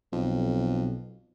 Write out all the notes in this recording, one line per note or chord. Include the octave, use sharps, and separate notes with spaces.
B1 F2